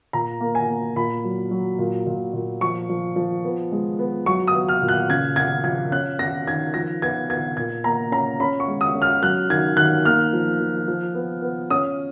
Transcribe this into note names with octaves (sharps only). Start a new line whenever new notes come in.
A#2 A#5
A#3
G#5
A#3
A#2 B5
F#3
F#3
A#2
A#2
A#2
F3 C#6
F3
F3
B3
G#3
B3
F#3 C#6
D#6
B3
F6
A#2
F#6
C#3 G#6
C#3 G#6
F3 G#6
C#4 F#6
C#4 A#6
D#3 G#6
F3 A#6
B3 G#6
B3 G#6
A#2 G#6
A#3 A#5
C#4 A#5
C#4 B5
C#6
G#3
D#6
C#4
F6
F#3 F#6
D#3 G#6
D#3 F#6
A#3 F6
F3
F3
F3
B3
B3
C#4 D#6